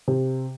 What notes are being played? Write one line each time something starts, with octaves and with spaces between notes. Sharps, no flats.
C3